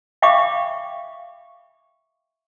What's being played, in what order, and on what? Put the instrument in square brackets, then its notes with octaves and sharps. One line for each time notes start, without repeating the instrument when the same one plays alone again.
[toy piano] E5 F5 G5 B5 C#6 D6